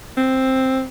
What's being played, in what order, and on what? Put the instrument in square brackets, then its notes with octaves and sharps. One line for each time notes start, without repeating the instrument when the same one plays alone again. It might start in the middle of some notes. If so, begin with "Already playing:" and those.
[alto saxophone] C4